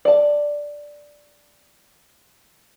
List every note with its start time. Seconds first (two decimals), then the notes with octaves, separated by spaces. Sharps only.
0.05 D5 A5